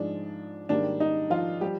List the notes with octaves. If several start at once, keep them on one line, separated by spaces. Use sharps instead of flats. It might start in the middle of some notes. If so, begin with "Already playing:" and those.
Already playing: G#2 F3 G#3 D4
G#2 D#3 G3 A#3 D4
D#4
F3 F4
F3 G3 G4